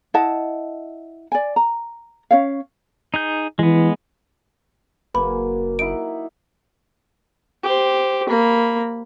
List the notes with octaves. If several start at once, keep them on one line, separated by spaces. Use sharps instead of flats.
E4 D#5 F#5 A5
D5 G#5
A#5
C#4 C#5 F5
D#4 G#4 G6
E3 G#3 B3
F#1 C#3 F#3 A#3 B4 B5
D#4 E4 F#5 D7
G4 C5
A#3 B5